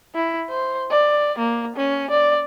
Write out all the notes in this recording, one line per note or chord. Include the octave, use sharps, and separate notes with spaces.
E4
C5
D5
A#3
C#4
D5